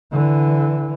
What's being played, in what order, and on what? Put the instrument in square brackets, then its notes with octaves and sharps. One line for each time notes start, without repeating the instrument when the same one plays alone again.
[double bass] D3 E3